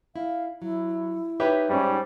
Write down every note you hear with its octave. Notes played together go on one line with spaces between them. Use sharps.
E4 F5
F#3 E4
D#4 G4 B4 C#5 E5
G#2 G3 C#4 C5